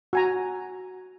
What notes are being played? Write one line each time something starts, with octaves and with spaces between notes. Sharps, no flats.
F#4 G#5 A#5